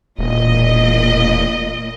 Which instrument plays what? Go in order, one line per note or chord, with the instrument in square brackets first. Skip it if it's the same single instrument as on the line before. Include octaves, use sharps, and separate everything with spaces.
[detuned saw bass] E1 [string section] A#2 D#5